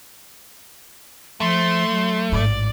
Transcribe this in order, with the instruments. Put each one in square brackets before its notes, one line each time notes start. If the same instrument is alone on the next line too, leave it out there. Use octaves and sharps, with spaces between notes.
[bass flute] F3 [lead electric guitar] A3 [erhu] C6
[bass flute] F#3
[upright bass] A1 G#2 [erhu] D5